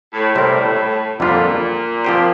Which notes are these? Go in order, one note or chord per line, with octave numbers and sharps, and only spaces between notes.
A2
A2 C3 G3 C4 E4 A#4
F2 A#2 D3 G3 D4 F4
F3 C4 G4 C5